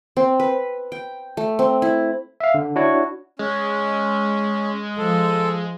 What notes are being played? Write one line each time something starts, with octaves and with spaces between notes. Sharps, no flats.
C4
B4
G5
A3
C4
E4
E5 F5
D3
D4 E4 F#4 C#5
G#3 C#4
F3 A4